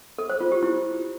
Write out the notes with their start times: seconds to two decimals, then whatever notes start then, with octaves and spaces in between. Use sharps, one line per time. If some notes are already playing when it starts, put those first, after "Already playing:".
0.18 A4
0.30 C5
0.41 F4
0.52 G4
0.63 E4